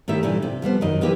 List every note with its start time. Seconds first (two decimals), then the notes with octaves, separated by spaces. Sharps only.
0.08 A2 D#3 E4 G4 E5
0.23 A#2 D3 E3 G3
0.42 C3
0.62 F3 G3 B3 C5
0.81 F#2 D#3 D#5
1.01 C3 E3 A#3 G4